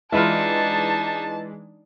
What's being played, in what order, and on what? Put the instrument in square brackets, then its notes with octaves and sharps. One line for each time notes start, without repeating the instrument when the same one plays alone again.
[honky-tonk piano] E3 G#3 [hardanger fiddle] D4 D#4 [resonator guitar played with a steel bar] F4 B4 E5 [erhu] A5